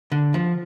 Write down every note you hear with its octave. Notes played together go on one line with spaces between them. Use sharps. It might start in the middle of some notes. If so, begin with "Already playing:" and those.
D3
F3